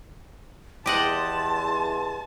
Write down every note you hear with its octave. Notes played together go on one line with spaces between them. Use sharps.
E2 G4 D#5 F#5 A5 C6